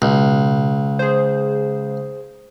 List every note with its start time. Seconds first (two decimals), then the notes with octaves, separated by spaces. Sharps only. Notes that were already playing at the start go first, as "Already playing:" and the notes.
0.02 C#2 B2
0.99 G#4 C5